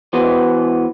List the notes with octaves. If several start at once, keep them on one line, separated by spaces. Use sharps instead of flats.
E3 B3 F#4 B4 C5